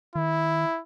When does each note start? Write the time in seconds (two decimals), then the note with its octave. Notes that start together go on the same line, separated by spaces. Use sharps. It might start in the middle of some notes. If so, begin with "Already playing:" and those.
0.15 D#3 E4